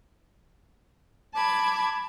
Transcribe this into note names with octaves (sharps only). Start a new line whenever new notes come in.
A5 B5 D6 G#6